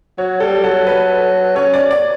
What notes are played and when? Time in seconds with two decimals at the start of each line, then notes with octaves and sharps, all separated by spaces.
0.18 F#3 C#5
0.40 G3 A4
0.64 F#3 A4
0.87 B4
1.56 C#4 C#5
1.74 D5
1.91 D5